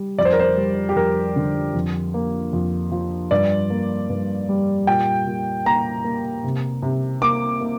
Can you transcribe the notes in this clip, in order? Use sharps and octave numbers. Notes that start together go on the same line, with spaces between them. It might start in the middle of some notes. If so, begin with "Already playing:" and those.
Already playing: G3
F2 D5
C5
A#4
C5
G3
G4
F2 A#4
D3
F2
A#3
F2
F3
G2 D5
A#3
G2
G3
A#2 G5
A#2
A#3 A#5
A#3
C3
C3
A#3 D6
A#3